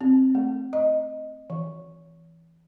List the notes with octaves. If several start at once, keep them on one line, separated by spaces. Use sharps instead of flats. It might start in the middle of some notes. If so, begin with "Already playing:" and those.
C4
A3
D#5
E3